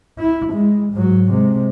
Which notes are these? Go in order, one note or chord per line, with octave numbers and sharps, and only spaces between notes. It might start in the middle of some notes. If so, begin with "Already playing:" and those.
E4
G#3
G#2 F#3
C3 G#3